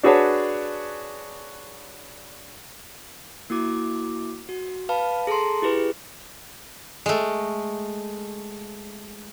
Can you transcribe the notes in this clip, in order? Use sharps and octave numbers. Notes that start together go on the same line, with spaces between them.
D4 F#4 G#4 B4 C#5 A5
A#3 E4 F#4 D6
F#4
B4 F5 A5 B5
G#4 A4 A5 A#5 C6
E4 G4 G#4 B4
G#3 A3